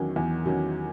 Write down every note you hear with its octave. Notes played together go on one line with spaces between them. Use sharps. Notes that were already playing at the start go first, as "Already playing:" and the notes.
Already playing: E2 D#3 F#3 C#4
E2
D#3 F#3 C#4